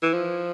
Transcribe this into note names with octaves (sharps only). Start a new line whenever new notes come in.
E3
F3